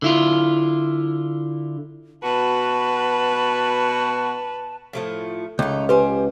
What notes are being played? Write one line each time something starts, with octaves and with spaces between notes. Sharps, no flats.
D3 E4 F4
B2 F#4 B4 A5
A2 F3 A3
C#2 A3 D#4
G4 B4 C5 G#5